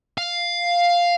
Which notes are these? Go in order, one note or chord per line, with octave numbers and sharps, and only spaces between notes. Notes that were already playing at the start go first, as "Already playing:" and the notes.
F5